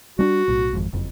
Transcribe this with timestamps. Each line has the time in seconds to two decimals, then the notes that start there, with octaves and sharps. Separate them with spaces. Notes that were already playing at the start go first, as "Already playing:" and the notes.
0.19 G3 C#4 D4 F#4
0.48 B1 A2
0.73 G#1 F2 G#2
0.93 F#1 F2